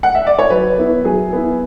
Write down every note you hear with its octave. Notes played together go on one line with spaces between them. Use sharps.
F#5
E5
D5
C#5
F#3 B4
B3 E4
F#3 G#4
B3 E4